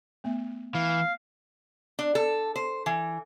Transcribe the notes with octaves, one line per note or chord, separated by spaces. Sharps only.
A3 B3 E5
E3 F5
D4
A4
C5
E3